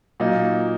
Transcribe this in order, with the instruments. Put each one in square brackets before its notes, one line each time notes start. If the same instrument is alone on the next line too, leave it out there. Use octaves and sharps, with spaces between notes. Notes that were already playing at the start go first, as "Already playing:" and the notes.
[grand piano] A#2 F#3 A#3 D#4